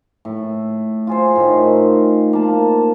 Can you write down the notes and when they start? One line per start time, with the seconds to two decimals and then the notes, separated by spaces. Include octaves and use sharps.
0.25 A2
1.07 F4 G#4 C5
1.36 A2 D#3
2.33 A#3 A5